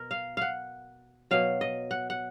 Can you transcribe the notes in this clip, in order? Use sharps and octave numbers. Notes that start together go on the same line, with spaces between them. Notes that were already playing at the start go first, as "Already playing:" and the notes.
Already playing: B2 A#4
F5
F5 F#5
B2 F#3 F5
D#5
F#5
F#5